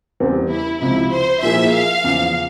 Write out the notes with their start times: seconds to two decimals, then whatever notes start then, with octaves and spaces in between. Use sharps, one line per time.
0.20 E2 C#3 G3 C4 G4
0.50 E4
0.80 C#2 C3 F3 E4
1.12 C5
1.42 A#2 F3 A#3 E4 G#4 E5
1.73 F5
2.04 E2 C#3 F3